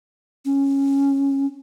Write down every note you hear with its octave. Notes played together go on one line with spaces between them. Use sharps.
C#4